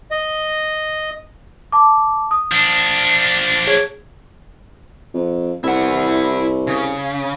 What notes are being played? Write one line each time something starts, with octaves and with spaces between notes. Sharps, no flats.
D#5
A5 D6
D#6
F3 D4
G#4 C#5 G#6
F2
C2 E4 F#5
C#3